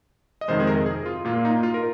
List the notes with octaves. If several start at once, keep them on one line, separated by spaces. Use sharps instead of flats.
D#5
F2 C3 D#3 G#3 C5
G#4
A#4
G#4
F4
A#2 A#3 F4
D#4
F4
A#4